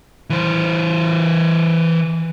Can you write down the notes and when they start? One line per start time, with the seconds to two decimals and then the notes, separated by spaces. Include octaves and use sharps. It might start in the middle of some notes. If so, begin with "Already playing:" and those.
0.30 E3 C5